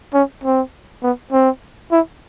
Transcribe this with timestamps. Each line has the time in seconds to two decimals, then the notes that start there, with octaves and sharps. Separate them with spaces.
0.14 C#4
0.44 C4
1.03 B3
1.32 C4
1.91 E4